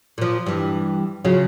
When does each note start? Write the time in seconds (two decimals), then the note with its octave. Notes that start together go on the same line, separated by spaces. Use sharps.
0.18 A#2 F3
0.46 G2 E3
1.24 C#3 F#3 F4